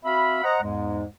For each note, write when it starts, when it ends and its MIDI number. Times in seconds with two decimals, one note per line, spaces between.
0.05 0.40 60
0.05 0.40 66
0.05 0.40 76
0.05 0.40 77
0.05 0.40 83
0.44 0.61 72
0.44 0.61 75
0.44 0.61 78
0.44 0.61 82
0.62 1.05 40
0.62 1.05 44
0.62 1.05 56